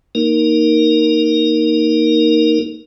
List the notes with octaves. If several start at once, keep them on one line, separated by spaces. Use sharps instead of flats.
A#3 D#4 A#4